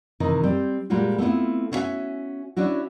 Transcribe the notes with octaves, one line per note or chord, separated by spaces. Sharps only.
C3 D#3 E3 D#5
G3 C4 C5
A#2 G3 G#3 F4 F#4
A3 B3 C4 D4 E4 F4
B3 C#4 E4 F#4 E5 G#5
C#4 D4 E4 F#4